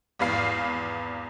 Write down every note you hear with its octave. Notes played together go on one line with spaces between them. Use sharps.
G#1 E2 B4 F5 C7